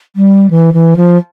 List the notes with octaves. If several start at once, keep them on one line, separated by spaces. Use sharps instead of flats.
G3
E3
E3
F3